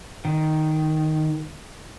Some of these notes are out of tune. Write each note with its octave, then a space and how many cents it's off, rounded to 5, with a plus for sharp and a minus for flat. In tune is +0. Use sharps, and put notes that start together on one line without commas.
D#3 +0